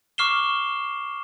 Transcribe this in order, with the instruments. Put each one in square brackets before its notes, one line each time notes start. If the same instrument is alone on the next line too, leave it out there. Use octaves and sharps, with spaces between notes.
[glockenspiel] C#6 D6 F6 C7 E7 G7